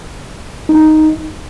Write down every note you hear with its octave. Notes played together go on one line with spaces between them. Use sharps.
D#4